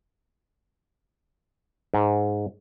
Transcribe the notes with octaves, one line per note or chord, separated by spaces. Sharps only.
G#2